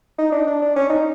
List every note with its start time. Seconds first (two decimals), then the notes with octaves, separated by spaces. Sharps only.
0.18 D#4
0.32 D4
0.47 D4
0.62 D4
0.76 C#4
0.89 D#4